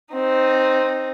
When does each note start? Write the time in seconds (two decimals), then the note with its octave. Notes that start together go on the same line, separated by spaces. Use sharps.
0.14 C4 D#4